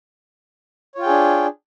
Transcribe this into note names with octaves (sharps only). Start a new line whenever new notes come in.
D4 F4 G#4 C#5 G5